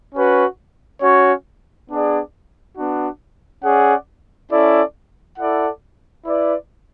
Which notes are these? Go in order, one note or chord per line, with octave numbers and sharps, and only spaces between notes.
C#4 F#4 B4
C#4 F#4 C#5
B3 D4 G#4 D5
B3 D4 F#4
C#4 G#4 D5 F#5
C#4 E4 A4 D5
E4 A4 D5 F#5
E4 B4 D5